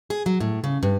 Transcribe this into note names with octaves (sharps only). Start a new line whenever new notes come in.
G#4
F#3
A2
C#3
G2